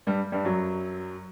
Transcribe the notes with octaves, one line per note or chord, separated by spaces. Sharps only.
G2 G3
G2 G3
F#2 F#3